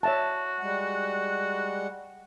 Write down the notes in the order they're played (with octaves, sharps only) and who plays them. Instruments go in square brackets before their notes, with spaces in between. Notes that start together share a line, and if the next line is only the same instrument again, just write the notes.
[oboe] F#4 [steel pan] C#5 E5 A5
[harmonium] G3 G#3 F#5